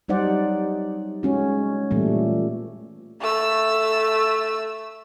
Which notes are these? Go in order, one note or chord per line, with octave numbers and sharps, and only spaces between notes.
F#3 G3 D#4 C5 D5 F#5
G#3 C#4 F#4
A#2 E3 G3 A3
A3 E6